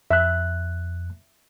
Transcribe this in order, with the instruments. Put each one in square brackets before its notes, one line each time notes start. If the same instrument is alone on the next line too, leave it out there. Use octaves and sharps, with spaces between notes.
[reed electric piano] F2 F#6 [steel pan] E5